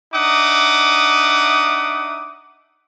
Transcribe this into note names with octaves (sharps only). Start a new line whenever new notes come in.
D4 D#4 E5 F#5 D6 D#6